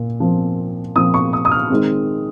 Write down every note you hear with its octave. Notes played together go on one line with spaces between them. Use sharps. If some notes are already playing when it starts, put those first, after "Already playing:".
Already playing: A#2
A#2 F3 C4
A#2 F3 C4 D#6
C#6
D#6
D#6
F6
D#3 G#3 C4